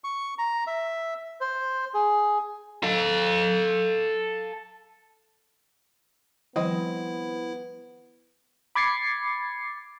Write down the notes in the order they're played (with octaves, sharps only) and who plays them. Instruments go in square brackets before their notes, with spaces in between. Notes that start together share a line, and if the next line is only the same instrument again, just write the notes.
[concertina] C#6
A#5
E5
C5
G#4
[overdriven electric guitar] A4 F5
[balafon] D#3 F3 G3 [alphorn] B3 [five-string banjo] C4 D#5 [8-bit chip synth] E4
[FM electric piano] B5 D6 G#6 A6 C7 C#7